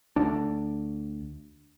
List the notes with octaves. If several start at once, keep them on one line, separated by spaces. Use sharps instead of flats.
D2 D4